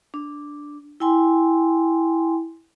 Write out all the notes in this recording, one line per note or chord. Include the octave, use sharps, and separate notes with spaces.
D4
E4 G5 G#5 C6